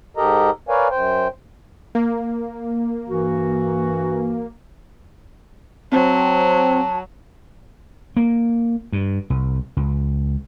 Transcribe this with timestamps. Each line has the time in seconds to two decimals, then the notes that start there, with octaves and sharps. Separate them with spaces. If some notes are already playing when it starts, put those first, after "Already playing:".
0.17 G#2 G4 A4 A#4 D#5 A#5
0.69 A#4 B4 C#5 D5 F5 G#5
0.91 F#2 C5 G5
1.95 A#3
3.08 G2 E3 F#4
5.92 F#3 C4 A5
8.17 A#3
8.93 G2
9.30 C2
9.77 C#2